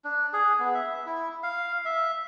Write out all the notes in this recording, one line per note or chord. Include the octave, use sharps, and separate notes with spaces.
D4
G#4
B3
E5
E4
F5
E5